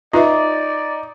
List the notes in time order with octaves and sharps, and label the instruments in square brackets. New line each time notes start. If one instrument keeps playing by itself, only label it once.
[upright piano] D#4 [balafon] F4 B4 E5 [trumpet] D5